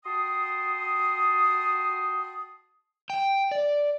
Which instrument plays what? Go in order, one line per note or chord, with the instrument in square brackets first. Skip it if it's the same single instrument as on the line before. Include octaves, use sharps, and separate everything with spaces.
[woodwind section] F#4 G5 A5 C6 D#6
[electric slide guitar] G5
D5